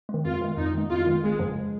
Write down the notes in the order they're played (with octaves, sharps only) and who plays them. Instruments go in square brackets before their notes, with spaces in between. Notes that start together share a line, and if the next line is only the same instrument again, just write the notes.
[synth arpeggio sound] G#3
D#3
[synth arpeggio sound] F2 [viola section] F4
[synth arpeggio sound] D#3 G#3
[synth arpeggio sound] F2 [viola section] D#4
[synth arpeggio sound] D#3 G#3
[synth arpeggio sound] F2 [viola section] F4
[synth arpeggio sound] D#3 G#3
[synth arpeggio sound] G#1 [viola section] G#3
[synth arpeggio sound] F#2 C#3 F3